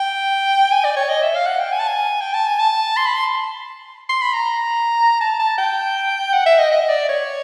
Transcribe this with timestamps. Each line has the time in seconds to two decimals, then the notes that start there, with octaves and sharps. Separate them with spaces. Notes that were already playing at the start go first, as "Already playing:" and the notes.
Already playing: G5
0.72 G#5
0.84 D5
0.96 C#5
1.09 D#5
1.22 E5
1.35 F5
1.46 F#5
1.59 G5
1.72 G#5
1.79 A5
1.87 G#5
2.21 G5
2.34 A5
2.47 G#5
2.59 A5
2.97 C6
3.06 B5
3.15 C6
4.09 C6
4.22 B5
4.33 A#5
5.21 A5
5.39 A5
5.58 G5
6.33 F#5
6.46 E5
6.58 D#5
6.71 D#5
6.89 D5
7.09 C#5